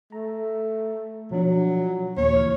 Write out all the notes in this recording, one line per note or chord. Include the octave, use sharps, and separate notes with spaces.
A3 A#5
B2 F3 F#3 D4
D#2 A#2 C#5
C#2 E3 F6